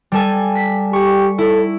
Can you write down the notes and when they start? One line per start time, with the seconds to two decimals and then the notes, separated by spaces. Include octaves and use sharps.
0.12 G3 A4 G#5
0.55 B6
0.93 G4 C#6
1.38 E4 A4